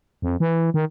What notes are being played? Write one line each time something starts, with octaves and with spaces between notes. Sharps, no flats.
F2
E3
D#3